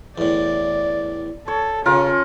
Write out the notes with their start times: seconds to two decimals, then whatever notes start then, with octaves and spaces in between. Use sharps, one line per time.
0.18 E2 A2 D5
1.48 A4 C#5
1.86 C#3 C#4 F4 A#4